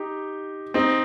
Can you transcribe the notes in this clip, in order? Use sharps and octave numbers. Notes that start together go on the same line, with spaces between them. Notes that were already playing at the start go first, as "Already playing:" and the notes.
Already playing: D#4 G4
C4 D#4